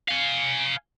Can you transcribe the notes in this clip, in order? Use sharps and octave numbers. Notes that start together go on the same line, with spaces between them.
F5 G#5